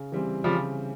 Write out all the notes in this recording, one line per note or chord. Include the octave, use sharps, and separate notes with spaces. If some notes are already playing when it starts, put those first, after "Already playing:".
Already playing: C#3
E3 G3 C4
C#3 F3 G3